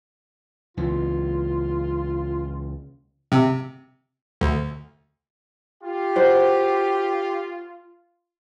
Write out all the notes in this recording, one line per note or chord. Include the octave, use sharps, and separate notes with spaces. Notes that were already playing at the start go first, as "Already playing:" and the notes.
C#2 E3 F4
C3
D2
F4 G4
F#4 A#4 C5